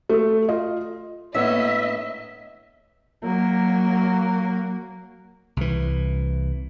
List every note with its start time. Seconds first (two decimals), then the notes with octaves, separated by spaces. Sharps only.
0.09 A3
0.48 F4 D#5
1.35 A2 A#3 B3 D4 C#5 D#5 E5
3.24 F#3 A#3
5.57 C2 E3